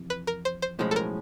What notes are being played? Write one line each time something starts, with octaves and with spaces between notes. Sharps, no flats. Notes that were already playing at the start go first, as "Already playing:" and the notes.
Already playing: F2 C3 E3
B4
A#4
C5
C5
B1 A2 F3 G#3 C#4
A4
A#4